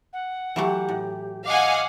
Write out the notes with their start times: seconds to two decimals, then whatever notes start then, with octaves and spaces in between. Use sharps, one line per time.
0.13 F#5
0.56 E3 F#3 A3 G4
0.89 A2
1.45 D#5 F5 F#5 G#5 D6